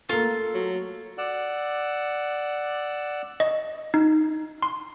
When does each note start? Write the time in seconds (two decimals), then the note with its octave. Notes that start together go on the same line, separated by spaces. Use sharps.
0.09 A3 A#3 F4 A4
0.54 F#3
1.18 D5 F#5 E6
3.40 D#5
3.94 D#4
4.63 C6